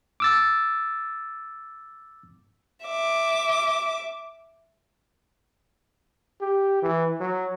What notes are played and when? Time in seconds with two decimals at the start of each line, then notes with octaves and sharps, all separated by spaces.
0.20 D6 E6 A6
2.85 E5 D6
6.41 G4
6.82 E3
7.20 F#3